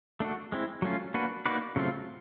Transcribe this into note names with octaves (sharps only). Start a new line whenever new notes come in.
A3 D4 F#4
G#3 C4 E4
F#3 A3 C#4 F4
A#3 D4 F#4 B4
A#3 D#4 F#4 B4 D5
C#3 F#3 A3 C4 F4